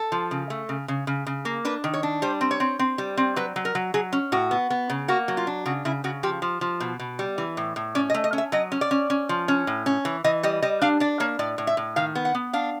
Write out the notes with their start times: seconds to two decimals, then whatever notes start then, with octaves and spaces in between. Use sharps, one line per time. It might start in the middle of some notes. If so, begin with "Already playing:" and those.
Already playing: A4
0.12 F3
0.31 C#3
0.50 A3
0.69 C#3
0.88 C#3
1.07 C#3
1.27 C#3
1.45 A#3
1.65 D4 B4
1.84 D#3
1.94 C#5
2.03 D4
2.22 G3 C5
2.41 C4
2.51 C#5
2.60 C4
2.79 C4
2.98 G3
3.17 C4
3.36 F#3 B4
3.56 F#3
3.65 A#4
3.75 F#3
3.94 F#3 G#4
4.13 C#4
4.32 A2 F#4
4.51 B3
4.70 B3
4.90 C#3
5.08 A#3 F#4
5.28 F#3
5.37 F4
5.47 D4
5.66 C#3 F#4
5.85 C#3 E4
6.04 C#3 F#4
6.23 F3 G4
6.42 F3
6.61 F3
6.80 B2
6.99 B2
7.19 G3
7.38 E3
7.57 A2
7.76 A2
7.95 C#4 D5
8.10 D#5
8.14 A3
8.24 D#5
8.33 C#4
8.38 E5
8.52 F#3 D#5
8.72 C#4
8.81 D5
8.91 C#4
9.10 C#4
9.29 F3
9.48 C#4
9.67 A2
9.86 C#4
10.05 E3
10.24 E3 D#5
10.43 G3 D#5
10.62 G3 D#5
10.82 D4 F5
11.00 D4 D5
11.20 A#3 C#5
11.39 A2 D5
11.58 A2
11.67 E5
11.77 A2
11.96 D#3 F5
12.15 B3
12.25 F#5
12.35 B3
12.53 D4 F5